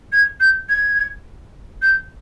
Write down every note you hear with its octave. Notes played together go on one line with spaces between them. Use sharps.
G#6
G6
G#6
G6